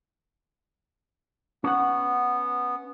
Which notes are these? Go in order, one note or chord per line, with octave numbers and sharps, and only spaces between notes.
B3 C#4 F#5